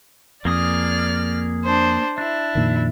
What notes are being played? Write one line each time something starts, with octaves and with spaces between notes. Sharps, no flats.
F2 A#3 G#4 D5 D#6 F6
D4 C5
D4 E4
F2 A#2 D#3